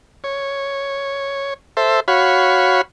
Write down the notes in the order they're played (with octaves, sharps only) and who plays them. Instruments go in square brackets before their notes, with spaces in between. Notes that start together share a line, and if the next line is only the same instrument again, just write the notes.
[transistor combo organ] C#5
A4 C5 E5
F#4 C#5 F5 B5